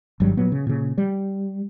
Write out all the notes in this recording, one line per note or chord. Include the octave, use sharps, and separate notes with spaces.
G#1 G2 F#3 G3
A#2 F#3 B3
C#3
A#2 C#3
G3